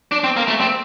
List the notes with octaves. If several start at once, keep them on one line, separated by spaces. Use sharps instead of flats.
D4
C4
A#3
A3
C4